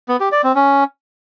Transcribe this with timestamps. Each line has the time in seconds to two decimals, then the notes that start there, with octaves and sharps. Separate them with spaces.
0.09 B3
0.20 G4
0.32 D5
0.44 C4
0.55 C#4